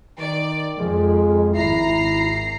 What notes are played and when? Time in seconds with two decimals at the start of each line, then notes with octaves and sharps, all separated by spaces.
0.19 D#3 D5
0.78 F2 G#3
1.54 G#1 E4 A#5 C7